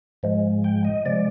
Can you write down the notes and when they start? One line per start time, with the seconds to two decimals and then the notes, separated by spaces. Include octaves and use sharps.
0.23 G#2 F3 G#3
0.64 G5
0.85 D#5
1.05 C3 F3 G#3 D5